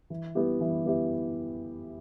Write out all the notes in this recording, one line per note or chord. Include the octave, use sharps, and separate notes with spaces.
E3
B3 E4 G4
E3
B3 E4 G4